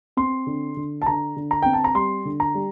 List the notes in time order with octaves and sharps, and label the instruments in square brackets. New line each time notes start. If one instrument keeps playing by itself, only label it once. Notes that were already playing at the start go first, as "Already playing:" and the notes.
[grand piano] C4 C6
D3
D3
A5
D3 A#5
D3
A#5
C4 G5
A5
A#5
G3 C6
D3
A#5
G3